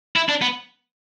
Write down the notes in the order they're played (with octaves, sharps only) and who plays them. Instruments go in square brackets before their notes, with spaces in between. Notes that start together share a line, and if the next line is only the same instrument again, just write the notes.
[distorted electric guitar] E4
D4
B3